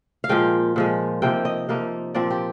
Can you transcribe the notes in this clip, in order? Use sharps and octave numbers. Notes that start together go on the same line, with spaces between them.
F5
A#2 F3 G#3 G5
A#2 F3 G#3
C3 F3 A#3 D#4 G5
D#5
C3 F3 A#3 D#4
A#2 F3 C4 D5
G4